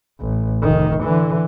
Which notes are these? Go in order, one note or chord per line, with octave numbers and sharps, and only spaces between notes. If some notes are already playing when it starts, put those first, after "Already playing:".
A1
F1 D#3
D3 E3